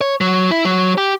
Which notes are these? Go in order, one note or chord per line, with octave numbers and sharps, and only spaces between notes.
C#5
F#3
E4
F#3
G4